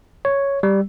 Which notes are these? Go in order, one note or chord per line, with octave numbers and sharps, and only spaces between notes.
C#5
G3